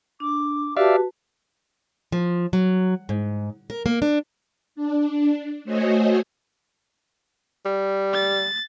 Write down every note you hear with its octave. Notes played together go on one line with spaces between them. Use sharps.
D4 D6
F#4 G4 B4 D5 E5 F5 A5
F3
F#3
G#2
A#4
A#3
D4
D4
A3 F#4 C5 C#5 D#5 G#5
G3
A6